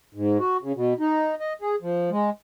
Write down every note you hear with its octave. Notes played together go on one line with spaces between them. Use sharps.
G#2
F#4
C#3
B2
D#4
D#5
G#4
F3
G#3